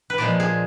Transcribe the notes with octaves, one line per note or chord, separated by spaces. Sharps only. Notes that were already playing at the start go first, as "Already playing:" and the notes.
B4
A#2 F3 G#3 D5
G#4